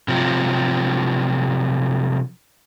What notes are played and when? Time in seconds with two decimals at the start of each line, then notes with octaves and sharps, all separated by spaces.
0.08 C3 F3 F#3